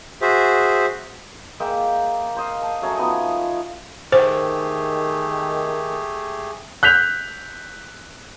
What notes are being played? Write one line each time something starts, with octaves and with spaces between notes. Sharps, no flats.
F#4 G#4 C5 E5
G#3 A#3 E5 G5
C5 D#5 F5
A5
F#3 A3 C#4 A#5
F3 B3 D#4 D#5
D#3 A3 G4 G#4 C5
F#6 G6 B6 F7